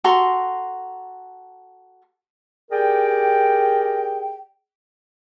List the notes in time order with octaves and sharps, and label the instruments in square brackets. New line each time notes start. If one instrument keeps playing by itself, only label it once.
[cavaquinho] F#4 A4 A#5 C6
[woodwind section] G4 G#4 A#4 D5 G5